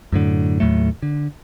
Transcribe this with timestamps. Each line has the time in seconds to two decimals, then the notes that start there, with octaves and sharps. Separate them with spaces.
0.12 F#2 A2 D3
0.60 D#2 A2 F#3 A3
1.02 D3